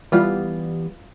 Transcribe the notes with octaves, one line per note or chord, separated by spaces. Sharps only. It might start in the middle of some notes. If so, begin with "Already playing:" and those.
E3 G3 B3 F4